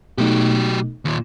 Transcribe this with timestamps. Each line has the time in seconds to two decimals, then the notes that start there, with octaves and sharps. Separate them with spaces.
0.18 B2 F#3 A3 D#4 G4
1.05 D#2 A#2